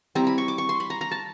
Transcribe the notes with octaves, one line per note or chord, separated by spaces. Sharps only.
G3 C4 E4 A#5
B5
C#6
D6
C#6
C6
B5
A#5
A#5
A5